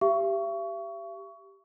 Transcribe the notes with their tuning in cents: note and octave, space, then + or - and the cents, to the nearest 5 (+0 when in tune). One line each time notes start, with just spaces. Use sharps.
G4 +0 E5 +45 C#6 +20